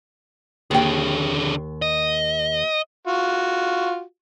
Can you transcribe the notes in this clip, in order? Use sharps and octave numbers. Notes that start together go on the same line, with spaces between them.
D#2 D3 G#4 G5
D#5
F4 F#4